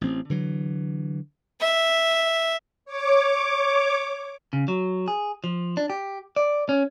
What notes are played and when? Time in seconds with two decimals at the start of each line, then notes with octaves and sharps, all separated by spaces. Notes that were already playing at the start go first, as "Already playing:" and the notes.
0.01 A1 C4
0.30 D3 E3 F#3
1.60 E5
2.85 C#5 D6
4.53 C#3
4.68 F#3
5.08 G#4
5.44 F3
5.77 D4
5.90 G4
6.36 D5
6.69 C#4